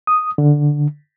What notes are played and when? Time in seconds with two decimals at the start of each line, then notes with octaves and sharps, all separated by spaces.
0.07 D#6
0.38 D3